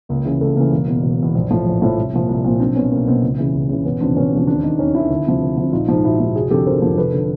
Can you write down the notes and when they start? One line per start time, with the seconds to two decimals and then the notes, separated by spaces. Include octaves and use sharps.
0.09 C#2 A#3
0.25 C#3 E3
0.41 C#2 A3
0.56 C#3 E3 A#3
0.72 E1
0.87 E2 B2
1.03 E1
1.19 E2 B2
1.35 A#1
1.51 A2 F3
1.66 A#1
1.82 A2 F3
1.97 C2
2.13 A#2 F3
2.29 C2
2.44 A#2 F3
2.59 B1 C4 D4
2.75 B2 B3 C#4
2.91 B1 A#3 C4
3.07 B2 A#3 C4
3.23 C#2
3.38 C#3 E3
3.53 C#2
3.69 C#3 E3
3.85 E1 B3 C#4
4.00 E2 C#3 F3 C4 D4
4.16 E1 B3 C#4
4.32 E2 C#3 F3
4.47 D#2 C4 D4
4.63 D#3
4.79 D#2 C#4 D#4
4.94 D#3 D4 E4
5.10 D2
5.26 C3 F3
5.42 D2
5.57 C3 F3
5.73 A#1 D#4 F4
5.88 G#2 F3
6.04 A#1 E4 F#4
6.20 G#2 F3
6.35 F1 F#4 G#4
6.50 F2 D3 F3 G4 A4
6.66 F1 A#4 C5
6.82 F2 D3 F3
6.98 F1 A4 B4
7.14 D3